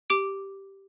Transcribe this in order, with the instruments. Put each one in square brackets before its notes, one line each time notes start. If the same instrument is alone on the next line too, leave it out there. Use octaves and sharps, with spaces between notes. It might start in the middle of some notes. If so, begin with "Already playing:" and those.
[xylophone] G4 D6 D7